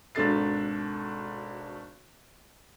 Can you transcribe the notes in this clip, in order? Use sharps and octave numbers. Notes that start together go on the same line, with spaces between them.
G#1 B2 D4 A4 A6 C7